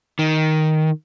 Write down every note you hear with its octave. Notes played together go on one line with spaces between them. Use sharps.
D#3